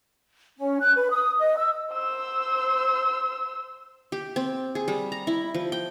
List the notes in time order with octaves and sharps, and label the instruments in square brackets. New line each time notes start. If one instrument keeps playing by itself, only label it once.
[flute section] C#4
F#6
B4
D#6
D#5
E6
[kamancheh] C5 E6
[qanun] G4
C4
G#4
G3
A#5
E4
F3
G5